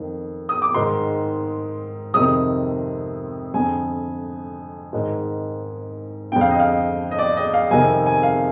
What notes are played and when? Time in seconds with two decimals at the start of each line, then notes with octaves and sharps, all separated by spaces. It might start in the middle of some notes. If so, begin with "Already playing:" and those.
Already playing: F2 D#3
0.49 D#6
0.62 D6
0.74 G#2 D#3 C6
2.14 F2 C3 D#3 D#6
3.54 F2 D3 G#5
4.93 G#2 D#3
6.32 F2 D3 G5
6.41 F5
6.51 D#5
6.60 F5
7.11 D#5
7.19 D5
7.37 D#5
7.54 F5
7.71 F2 C3 D#3 G#5
8.06 G#5
8.23 F5